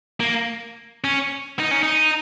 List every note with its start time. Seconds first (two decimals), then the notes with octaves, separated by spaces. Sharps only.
0.20 A#3
1.04 C#4
1.59 D#4
1.71 C#4
1.83 D#4